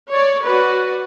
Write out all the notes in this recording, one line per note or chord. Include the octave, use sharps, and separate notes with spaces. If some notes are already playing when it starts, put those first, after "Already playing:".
C#5 D5
F#4 B4 D5